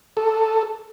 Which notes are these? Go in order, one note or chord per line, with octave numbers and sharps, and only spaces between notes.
A4